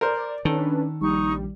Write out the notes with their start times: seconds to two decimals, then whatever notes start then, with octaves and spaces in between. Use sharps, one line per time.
0.01 A#4 C5 D5
0.45 D#3 C#4 D4 A4 B4
1.01 A#1 G3 D#4 C#6